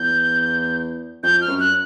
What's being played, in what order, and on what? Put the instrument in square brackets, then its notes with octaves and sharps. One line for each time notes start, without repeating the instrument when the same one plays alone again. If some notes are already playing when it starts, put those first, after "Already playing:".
Already playing: [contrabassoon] E2 [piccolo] G6
[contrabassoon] F2 [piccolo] G6
[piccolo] F6
[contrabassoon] F#2
[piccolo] F#6